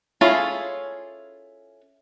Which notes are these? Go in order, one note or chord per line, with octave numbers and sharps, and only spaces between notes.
C#4 E4 F4 G#4 A4